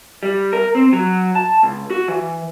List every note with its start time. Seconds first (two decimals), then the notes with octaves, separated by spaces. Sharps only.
0.23 G3
0.53 A#4
0.75 C4
0.93 F#3
1.35 A5
1.63 C#2
1.90 F#4
2.08 E3